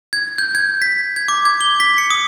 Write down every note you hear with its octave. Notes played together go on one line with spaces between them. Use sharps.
G#6
G6
G#6
B6
G#6
D6
G#6
G7
B6
C#7
D#6